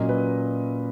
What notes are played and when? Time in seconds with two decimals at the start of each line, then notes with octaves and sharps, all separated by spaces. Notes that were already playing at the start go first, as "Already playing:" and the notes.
Already playing: A#2 F#3 A#3 C#4 D#5
0.09 B4